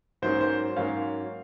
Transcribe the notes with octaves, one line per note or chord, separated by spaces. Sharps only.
G#2 F#3 A#3 C#4 C5
C5
G#2 F#3 A#3 C#4 F5